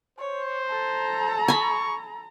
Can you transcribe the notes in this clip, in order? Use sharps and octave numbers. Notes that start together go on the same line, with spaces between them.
C5 C#5
A4 A#5
G#5 B5 C#6